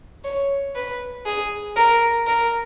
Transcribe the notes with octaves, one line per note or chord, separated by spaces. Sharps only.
C#5
B4
G#4
A#4
A#4